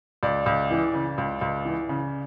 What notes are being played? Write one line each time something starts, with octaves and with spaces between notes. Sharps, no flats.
C#2 D5
C#2
E3
C#3
C#2
C#2
E3
C#3